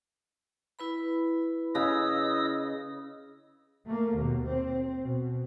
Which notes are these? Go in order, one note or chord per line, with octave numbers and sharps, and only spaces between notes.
E4 B4 B5
C#3 D#5 D#6 E6
A3 A#3
D#2 B2
C4
B2